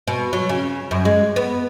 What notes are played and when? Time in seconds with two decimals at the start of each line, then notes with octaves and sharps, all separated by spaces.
0.07 B2
0.33 F#3
0.49 C#3
0.91 F#2
1.05 G#3
1.36 B3